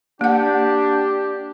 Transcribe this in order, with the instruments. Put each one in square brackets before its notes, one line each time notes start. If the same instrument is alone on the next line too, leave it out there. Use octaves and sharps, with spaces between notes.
[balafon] A#3 F#5 [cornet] D4 [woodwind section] G4